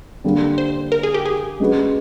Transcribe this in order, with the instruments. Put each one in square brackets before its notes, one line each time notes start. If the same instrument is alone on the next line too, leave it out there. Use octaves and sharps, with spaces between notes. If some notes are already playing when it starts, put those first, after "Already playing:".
[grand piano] D3 G3 A#3
[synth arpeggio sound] C5
A#4
G#4
G4
G#4
[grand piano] G#3 C#4 F#4 B4